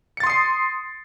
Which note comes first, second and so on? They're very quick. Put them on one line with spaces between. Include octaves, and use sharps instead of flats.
C#7 A6 C6 D#6 C7